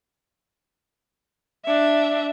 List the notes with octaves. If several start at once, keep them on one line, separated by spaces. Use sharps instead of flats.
D4 E5